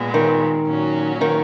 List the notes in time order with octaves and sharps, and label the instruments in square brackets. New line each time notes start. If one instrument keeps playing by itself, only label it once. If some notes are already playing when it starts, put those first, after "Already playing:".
Already playing: [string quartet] A#2 G#3 B3
[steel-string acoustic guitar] D#3
[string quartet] A#2 F#3 C#4 F#4
[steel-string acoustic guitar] D#3